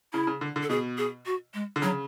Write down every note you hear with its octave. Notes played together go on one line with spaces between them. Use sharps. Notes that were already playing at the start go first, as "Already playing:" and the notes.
C#3 E4
C#3
D3
D3
A4
B2 G#4
G#4
F#4
G#3
D3
C#3 F#3